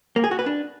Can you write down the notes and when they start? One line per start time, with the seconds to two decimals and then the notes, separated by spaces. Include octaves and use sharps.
0.16 A#3
0.24 G#4
0.31 F#4
0.39 B4
0.46 D4